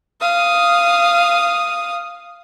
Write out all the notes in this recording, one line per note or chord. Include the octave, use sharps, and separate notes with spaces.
F5 D#6